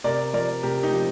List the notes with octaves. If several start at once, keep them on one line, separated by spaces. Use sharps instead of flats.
C3 A#4 D5
F3 A#4 D5
C3 G4 A#4
D#4 G4
F3